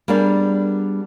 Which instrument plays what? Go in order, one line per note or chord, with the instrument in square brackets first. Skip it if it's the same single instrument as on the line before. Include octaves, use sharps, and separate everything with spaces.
[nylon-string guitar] G3 B3 D4 G#4 A#4 D5